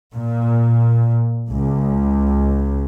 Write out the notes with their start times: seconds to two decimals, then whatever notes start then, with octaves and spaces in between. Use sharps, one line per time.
0.15 A#2
1.50 C#2